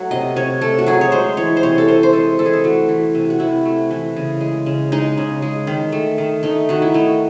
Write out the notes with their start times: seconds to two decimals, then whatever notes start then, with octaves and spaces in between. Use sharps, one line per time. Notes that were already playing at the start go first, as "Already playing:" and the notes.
Already playing: F#3 A3 F#5
0.11 C3 D#5
0.36 C3 C#5
0.61 A3 A4
0.79 F#4
0.86 F#3 G#4
1.01 C#5
1.12 G#3 C5
1.37 E3 C#5
1.57 C5
1.63 C3 C#5
1.78 A4
1.88 C3 C5
2.03 C5
2.13 G#3 A4
2.39 E3 A4
2.46 G#4
2.53 A4
2.64 A3 F#4
2.89 E3
3.15 C3
3.30 F#4
3.40 C3 E4
3.65 A3
3.91 E3
4.16 C#3
4.41 G#3
4.66 C#3
4.92 G#3 D#4
5.17 C#3
5.42 G#3
5.67 D#3
5.92 A3
6.18 D#3
6.43 A3 D#4
6.69 D#3 F#4
6.82 E4
6.94 A3 D#4